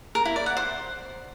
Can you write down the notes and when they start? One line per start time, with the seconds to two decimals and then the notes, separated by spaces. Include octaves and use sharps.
0.15 A#4
0.25 E4
0.36 D5
0.46 F#5
0.57 C5